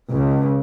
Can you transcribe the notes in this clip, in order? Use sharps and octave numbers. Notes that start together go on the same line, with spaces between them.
C#2